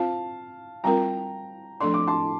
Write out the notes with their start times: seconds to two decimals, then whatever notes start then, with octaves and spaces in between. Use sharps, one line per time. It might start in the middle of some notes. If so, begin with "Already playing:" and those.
Already playing: C4 F4 C5 F5 A5
0.84 G3 C4 F4 A#4 G5 A#5
1.80 F3 A3 D4 A4 D5 C6
1.94 D6
2.07 A5 C6